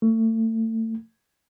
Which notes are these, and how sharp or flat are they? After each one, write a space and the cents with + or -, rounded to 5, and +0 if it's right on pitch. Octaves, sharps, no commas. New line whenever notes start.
A3 +30